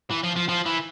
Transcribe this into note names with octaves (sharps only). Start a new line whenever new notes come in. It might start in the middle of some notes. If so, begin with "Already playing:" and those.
E3
F3
F3
F3
E3